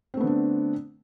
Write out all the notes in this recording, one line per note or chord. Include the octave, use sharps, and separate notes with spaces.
D3 A3 B3 C4 D4